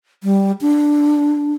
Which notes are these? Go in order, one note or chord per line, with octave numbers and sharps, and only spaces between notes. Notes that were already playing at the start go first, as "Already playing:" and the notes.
G3
D4